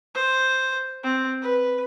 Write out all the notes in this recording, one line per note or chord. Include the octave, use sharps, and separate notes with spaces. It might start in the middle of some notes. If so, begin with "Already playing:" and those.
C5
C4
B4